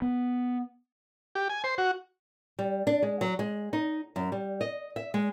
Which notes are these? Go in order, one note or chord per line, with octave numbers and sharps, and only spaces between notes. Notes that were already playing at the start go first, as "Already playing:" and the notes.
B3
G4
G#5
C5
F#4
G3
D4
G#3
F#3
G#3
D#4
F#2
G3
D#5
E5
G#3